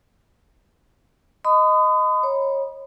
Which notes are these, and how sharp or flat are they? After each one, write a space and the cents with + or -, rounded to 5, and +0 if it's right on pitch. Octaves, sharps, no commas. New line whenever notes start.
D#5 +0 B5 +45 D#6 -15
C#5 -25 B5 -40